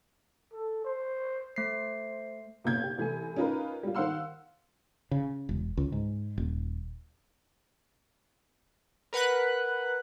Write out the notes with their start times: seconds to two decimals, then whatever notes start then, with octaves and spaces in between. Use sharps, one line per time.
0.53 A4
0.85 C5
1.56 A3 C5 C7
2.64 F#1 B1 A#2 G6 G#6
2.84 G4
2.98 C2 E3 A3 G#5
3.36 C#4 D#4 F4 A#4 B4
3.83 G3 F4
3.95 D#3 C5 F5 F#5 C6 E6
5.11 C#3
5.49 E1
5.77 C#2
5.92 G#2
6.38 D#1
9.13 A#4 B4 F#5 B5 F#6